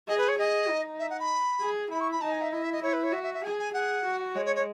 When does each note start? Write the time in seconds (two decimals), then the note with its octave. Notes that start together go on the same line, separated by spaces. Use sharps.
0.08 G#4 D#5
0.18 B4
0.28 C#5
0.38 G#4 D#5
0.69 D#4
0.99 E5
1.10 F#5
1.19 B5
1.60 G#4
1.90 E4 B5
2.00 C#6
2.11 B5
2.21 D#4 A5
2.32 G#5
2.41 E5
2.52 E4 D#5
2.62 E5
2.73 D#5
2.82 E4 C#5
2.93 B4
3.03 C#5
3.12 F#4 E5
3.23 E5
3.34 E5
3.44 G#4 G#5
3.59 G#5
3.73 G#4 F#5
4.05 F#4
4.35 G#3 C#5
4.45 C#5
4.55 C#5